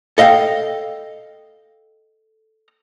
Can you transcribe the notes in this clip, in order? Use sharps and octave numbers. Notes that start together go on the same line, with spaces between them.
A4 D#5 F5 G5